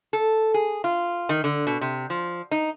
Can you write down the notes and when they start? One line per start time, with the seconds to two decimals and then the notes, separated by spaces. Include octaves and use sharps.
0.13 A4
0.54 G#4
0.84 F4
1.29 D#3
1.44 D3
1.67 B2
1.81 C3
2.10 F3
2.51 D#4